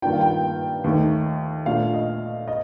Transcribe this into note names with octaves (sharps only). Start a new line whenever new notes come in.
G2 D#3 A#3 D4 F4 G5
F5
G5
D#2 D#3 A3 D#4
A#2 A3 D4 F5
D#5
D#5